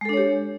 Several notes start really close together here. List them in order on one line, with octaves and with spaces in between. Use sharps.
G#3 A4 D4 C#5 G4